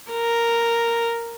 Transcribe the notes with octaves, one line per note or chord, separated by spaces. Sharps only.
A#4